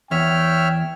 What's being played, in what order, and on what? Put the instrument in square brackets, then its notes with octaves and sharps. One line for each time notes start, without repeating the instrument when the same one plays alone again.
[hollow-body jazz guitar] E2 [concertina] C#5 E5 F6 [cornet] G5